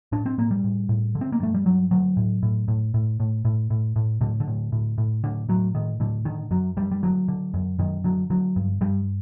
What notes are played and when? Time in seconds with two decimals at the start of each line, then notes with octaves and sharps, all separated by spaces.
0.12 A2 D4
0.26 C4
0.38 A2 A#3
0.51 G3
0.64 A2
0.89 A2
1.15 D3
1.21 C4
1.32 A#3
1.40 G2 A3
1.54 G3
1.66 G2 F#3
1.91 D3 F#3
2.17 A2
2.43 A2
2.68 A2
2.94 A2
3.20 A2
3.45 A2
3.70 A2
3.96 A2
4.21 A2 D3
4.40 D3
4.47 A2
4.72 A2
4.98 A2
5.24 A2 D3
5.49 A2 F#3
5.75 A2 D#3
6.00 A2 D3
6.25 D3 D#3
6.51 F#2 F#3
6.77 F#2 G3
6.91 G3
7.03 D3 F#3
7.28 D3
7.54 F#2
7.79 F#2 D#3
8.04 D3 F#3
8.30 D3 F#3
8.56 G2
8.81 G2 G3